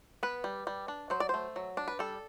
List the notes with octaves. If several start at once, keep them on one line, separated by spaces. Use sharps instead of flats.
B3 B4
G3
G3
D4
F#3 C5
D5
A3 C5
F#3
D4
B4
G3 A4